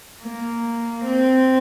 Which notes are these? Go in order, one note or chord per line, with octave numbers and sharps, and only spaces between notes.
A#3
C4